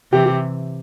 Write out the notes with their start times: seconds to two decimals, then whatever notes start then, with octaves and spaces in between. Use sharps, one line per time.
0.12 C3 E3 G4
0.26 G4